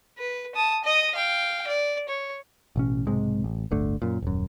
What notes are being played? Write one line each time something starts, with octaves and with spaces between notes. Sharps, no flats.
B4
A5 D#6
D#5 D#6
F5 G5
D5
C#5
A1 B2 C#4
B1 G#2 C3 G#3
A1
D1 G1 D3 A3
F#2 A#2
D#1 F#2